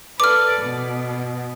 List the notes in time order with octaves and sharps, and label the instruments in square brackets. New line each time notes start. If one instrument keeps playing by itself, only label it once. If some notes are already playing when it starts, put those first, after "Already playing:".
[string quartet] A4 B4 D5 [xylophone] D6 F6
[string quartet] B2